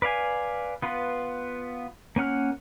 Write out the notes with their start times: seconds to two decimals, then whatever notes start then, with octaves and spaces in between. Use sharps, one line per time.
0.02 B4 D5 F5 G#5
0.82 B3 F4 B4
2.16 A#3 C#4 F#5 F6